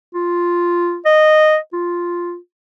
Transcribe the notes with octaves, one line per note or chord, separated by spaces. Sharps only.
F4
D#5
F4